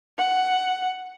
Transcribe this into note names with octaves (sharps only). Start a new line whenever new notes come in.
F#5